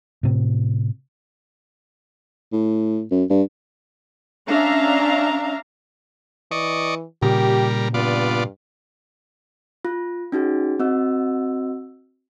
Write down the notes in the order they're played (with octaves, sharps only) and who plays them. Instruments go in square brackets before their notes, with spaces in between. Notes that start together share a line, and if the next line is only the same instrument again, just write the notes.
[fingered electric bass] A2 C3
[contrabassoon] A2
F#2
G2
[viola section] C#4 D4 E5 F5 A#5
[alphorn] E3 [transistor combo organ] D5 D#5 C#6
[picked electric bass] A#2 C#3 [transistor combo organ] G3 A#4 [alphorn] G4
[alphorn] G2 [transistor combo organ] B3 F4 D5
[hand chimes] F4
C#4 D#4 F#4 G#4
C4 F#4 D#5 E6